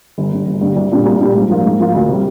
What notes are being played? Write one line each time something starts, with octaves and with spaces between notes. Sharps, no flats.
G1
G2 D3 G3
G1
G2 D3 G3
C2
A#2 G3 D4 G4
C2
A#2 G3 D4 G4
G#2
F3 A#3 F4
G#2
F3 A#3 F4
D2
C3 G3